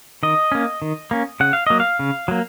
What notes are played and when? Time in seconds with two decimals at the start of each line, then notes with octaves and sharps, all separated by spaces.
0.23 D#3 D#5
0.52 A#3 C#4
0.82 D#3
1.11 A#3 C#4
1.40 C#3 F#5
1.53 F5
1.67 F#3 A#3 D#5
1.80 F5
1.99 C#3
2.28 F#3 A#3